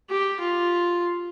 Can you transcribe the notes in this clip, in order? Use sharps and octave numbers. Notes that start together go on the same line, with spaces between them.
G4
F4